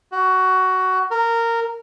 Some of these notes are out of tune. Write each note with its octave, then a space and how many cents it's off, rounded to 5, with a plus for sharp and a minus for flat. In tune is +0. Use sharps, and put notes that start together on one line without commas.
F#4 +15
A#4 -15